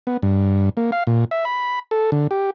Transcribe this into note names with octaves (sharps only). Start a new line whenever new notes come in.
B3
G2
A#3
F5
A#2
E5
B5
A4
D3
G4